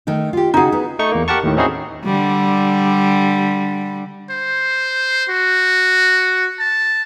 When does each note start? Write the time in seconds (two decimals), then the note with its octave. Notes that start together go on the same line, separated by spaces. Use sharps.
0.07 D#3 A3 D#4
0.33 F4 G4
0.54 C#3 D#4 F#4 G#4
0.72 B3
0.99 A3 D#4 C#6
1.12 E2 A#3
1.28 G4 A#4 F#5 A5 C#6
1.43 D#2 A2 D#3
1.57 C4 C#4 D#4 E4 F#4 G#4
2.05 D3 G3
4.31 C5
5.30 F#4
6.60 A5